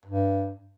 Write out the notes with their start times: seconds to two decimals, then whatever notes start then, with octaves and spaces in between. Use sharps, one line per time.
0.06 G2